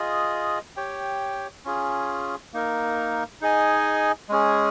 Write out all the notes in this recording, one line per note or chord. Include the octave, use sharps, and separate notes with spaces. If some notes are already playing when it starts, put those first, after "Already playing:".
Already playing: F4 G#4 D#5
G4 C#5 G5
C#4 F4 G#4
A#3 D#4 A#4
D#4 G#4 D#5 G#5
G#3 C#4 G#4